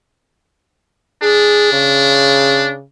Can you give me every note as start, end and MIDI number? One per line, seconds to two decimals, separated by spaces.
1.22 2.72 62
1.22 1.68 68
1.72 2.83 49